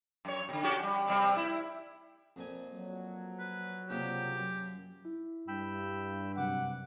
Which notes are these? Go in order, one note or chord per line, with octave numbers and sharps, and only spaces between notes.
F#2 C#5
B2 D3
C#4 F#4 G4
G3
C3 G3 C4
E4
F2 A#2 G#5
F#3
B4
C2 A#2 C#3 G4
F#2
E4
G2 G5 B5 E6
F#2 C3 G3 F#5 D6